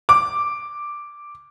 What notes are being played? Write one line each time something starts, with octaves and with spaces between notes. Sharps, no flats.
D6